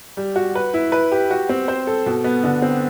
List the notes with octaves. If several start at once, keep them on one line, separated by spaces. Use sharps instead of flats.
G3
F#4
B4
E4
B4
G4
F#4
C4
C5
A4
B2
B3
D3
C4